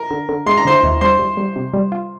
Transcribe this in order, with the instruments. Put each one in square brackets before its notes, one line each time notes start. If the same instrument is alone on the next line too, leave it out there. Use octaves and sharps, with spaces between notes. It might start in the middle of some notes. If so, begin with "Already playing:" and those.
Already playing: [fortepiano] A#4
[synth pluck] D3
D3
[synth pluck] G#3 [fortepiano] C6
[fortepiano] A#5
[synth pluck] D3 [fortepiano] C5 C6
[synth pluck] D#2
[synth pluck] G3 [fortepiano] C5 C6
[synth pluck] G3
G3
C3
G3
F4